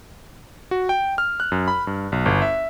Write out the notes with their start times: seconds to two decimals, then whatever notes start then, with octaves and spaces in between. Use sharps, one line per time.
0.71 F#4
0.89 G5
1.18 F6
1.40 F#6
1.52 F#2
1.68 B5
1.87 G2
2.12 B1
2.26 G1
2.42 E5